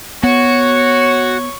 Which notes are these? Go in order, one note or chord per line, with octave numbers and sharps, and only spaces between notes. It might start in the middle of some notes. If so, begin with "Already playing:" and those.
B3 F#4 C#5 C#6